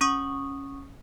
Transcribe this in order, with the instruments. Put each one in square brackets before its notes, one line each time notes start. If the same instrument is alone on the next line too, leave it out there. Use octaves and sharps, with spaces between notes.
[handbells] C#4 C#6 D#6